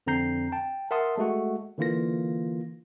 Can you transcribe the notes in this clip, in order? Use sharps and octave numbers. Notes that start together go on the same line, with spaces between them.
F2 D3 C4 A#5 G6 C7
G5 A5
A#4 E5 F#5 A5 C6 D#6
G#3 A3 F#4 F#5
D3 E3 A#3 F4 A#6